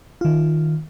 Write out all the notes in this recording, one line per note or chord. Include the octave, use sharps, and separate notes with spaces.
D#3 F4